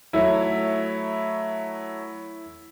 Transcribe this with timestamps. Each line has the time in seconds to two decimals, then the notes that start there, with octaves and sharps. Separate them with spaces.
0.13 F#3 A3 E4 C#5